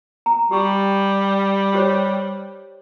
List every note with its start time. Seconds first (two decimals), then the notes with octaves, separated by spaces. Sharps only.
0.26 A#5
0.51 G3 G4 C#6
1.74 G4 C5 C#5